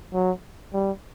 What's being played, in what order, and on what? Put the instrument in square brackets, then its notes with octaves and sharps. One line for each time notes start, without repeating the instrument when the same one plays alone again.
[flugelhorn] F#3
G3